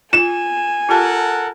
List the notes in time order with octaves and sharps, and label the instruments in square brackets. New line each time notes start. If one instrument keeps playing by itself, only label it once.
[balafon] F4 [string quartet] G#5 [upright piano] E7
[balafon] F4 G4 A5 [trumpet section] A4 A#4 F#5